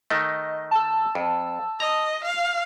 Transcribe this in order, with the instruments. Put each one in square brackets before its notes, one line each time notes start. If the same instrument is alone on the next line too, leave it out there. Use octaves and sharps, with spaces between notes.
[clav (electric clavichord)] D#3 A3 [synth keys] D#5
[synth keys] A5 E6
[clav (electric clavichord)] F2
[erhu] D#5 [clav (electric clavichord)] A#5
[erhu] F5